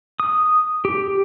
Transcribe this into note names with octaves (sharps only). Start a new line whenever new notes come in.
D#6
G4